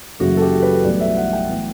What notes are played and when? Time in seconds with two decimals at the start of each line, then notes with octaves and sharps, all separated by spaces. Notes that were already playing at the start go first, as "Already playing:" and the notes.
0.19 F#1 F#2 C#3 E3 A3 F#4
0.37 A4
0.42 G4
0.63 B4
0.84 B1 A2 E3 G3 D5
1.01 E5
1.17 F#5
1.33 G5
1.49 A2 E3 B3